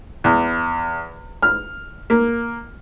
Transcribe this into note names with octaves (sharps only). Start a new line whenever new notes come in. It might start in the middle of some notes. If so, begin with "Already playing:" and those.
E2
F6
A#3